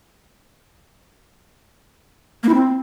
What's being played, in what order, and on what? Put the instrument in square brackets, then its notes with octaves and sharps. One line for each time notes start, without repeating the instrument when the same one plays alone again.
[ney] A#3
E4
C4